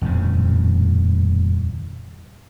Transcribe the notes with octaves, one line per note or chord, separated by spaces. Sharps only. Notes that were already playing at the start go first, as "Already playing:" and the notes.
D#1 F2 A2 C#3